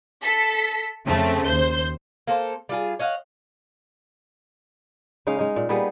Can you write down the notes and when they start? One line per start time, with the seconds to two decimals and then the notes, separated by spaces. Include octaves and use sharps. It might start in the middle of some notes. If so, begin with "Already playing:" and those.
0.22 A4 B6
1.06 F2 C#3 A3 C4
1.47 D#2 C5 G6
2.27 A#3 A4 C5
2.69 G3 F4 G#4
2.99 C#5 D#5 F5 F#5
5.27 C#3 G#3 D#4 F5
5.39 G#3 D#4
5.56 A#2
5.69 G3 A#3 B3 G#4